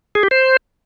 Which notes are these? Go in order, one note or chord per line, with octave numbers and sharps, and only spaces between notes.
G#4
G4
C5